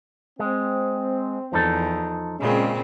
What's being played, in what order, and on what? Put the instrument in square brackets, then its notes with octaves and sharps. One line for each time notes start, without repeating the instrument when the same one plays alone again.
[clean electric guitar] G#3 [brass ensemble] C4
[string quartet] E2 [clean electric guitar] F3 D#4 A4
[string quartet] A#2 C#3 C4 [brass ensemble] G#3 C#4